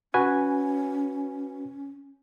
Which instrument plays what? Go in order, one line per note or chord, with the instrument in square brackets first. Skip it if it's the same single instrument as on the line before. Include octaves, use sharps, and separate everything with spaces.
[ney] C#4 [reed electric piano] F#4 B4 G#5